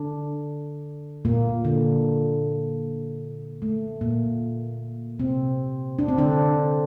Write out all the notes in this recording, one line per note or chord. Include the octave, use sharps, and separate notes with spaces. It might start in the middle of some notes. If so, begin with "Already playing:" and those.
Already playing: D3 D4
A#2 A#3
D3
A3
A#2 A#3
C3 C4
D4
C4
D3 D4